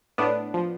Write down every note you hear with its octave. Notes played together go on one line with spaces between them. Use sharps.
A2 B3 D4
F3